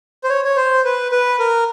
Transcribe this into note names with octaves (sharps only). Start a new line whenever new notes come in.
C5
C#5
C#5
C5
B4
B4
A#4